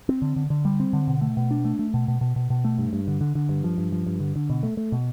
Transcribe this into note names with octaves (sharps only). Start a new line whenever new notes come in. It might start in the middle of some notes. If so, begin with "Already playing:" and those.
C4
D3
D3
D3
G3
C4
D3
B2
A3
B2
D4
A3
A3
B2
B2
B2
B2
B2
A3
G2
G2
D3
D3
D3
G2
F3
G2
F3
G2
D3
D3
B2
A3
A3
B2